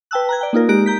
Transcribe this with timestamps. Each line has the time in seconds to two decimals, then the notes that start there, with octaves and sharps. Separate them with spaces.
0.11 B4 G5 A5 E6 F#6
0.29 A#5 F#6 G#6
0.41 D5 G5
0.53 A#3 D#4 F4 A#4
0.69 G#3 D#4 G4 A#5 F#6 D7
0.86 A#5 G6 B6